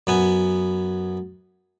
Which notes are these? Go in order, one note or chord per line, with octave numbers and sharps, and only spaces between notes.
F#2 B3 G#5